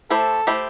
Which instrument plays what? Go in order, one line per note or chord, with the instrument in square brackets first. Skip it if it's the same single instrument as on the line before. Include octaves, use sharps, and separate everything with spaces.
[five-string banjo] A3 E4 G4 C5 [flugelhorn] A4
[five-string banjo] A3 E4 G4 C5